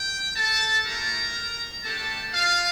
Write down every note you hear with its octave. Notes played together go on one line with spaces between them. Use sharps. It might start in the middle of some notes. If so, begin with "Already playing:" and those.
Already playing: G5
A4 A5
A3 E4 G4 A#4 A#5
A3 D4 G4 A4 A5
F4 F5